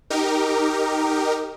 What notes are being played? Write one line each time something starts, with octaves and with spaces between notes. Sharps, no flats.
D#4 G4 A#4